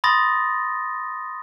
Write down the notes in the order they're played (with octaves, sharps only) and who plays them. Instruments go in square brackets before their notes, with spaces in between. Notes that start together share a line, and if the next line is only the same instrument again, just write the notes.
[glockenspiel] B5 C6 D#6 A6 A#6